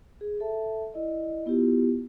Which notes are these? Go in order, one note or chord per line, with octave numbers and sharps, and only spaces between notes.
G#4
A4 E5 A5
E4 D5 D#5
B3 E4 F4 G4